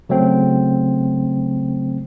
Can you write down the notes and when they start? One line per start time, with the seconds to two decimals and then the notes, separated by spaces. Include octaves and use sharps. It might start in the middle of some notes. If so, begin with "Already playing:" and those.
0.09 C#3 F#3 A3 C4